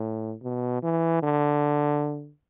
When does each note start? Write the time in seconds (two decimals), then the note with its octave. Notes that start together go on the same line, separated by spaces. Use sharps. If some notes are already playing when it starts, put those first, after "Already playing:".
Already playing: A2
0.43 B2
0.83 E3
1.23 D3